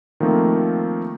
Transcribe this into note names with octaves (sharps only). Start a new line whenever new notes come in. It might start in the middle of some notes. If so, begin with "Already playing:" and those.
D#3 F3 A3 A#3 C4